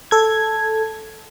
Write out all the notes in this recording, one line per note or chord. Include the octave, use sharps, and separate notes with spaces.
A4 G#6